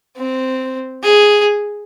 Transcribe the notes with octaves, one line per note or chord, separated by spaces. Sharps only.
C4
G#4